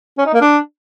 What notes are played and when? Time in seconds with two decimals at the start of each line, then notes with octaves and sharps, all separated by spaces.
0.18 C#4
0.26 D#4
0.34 A#3
0.41 D4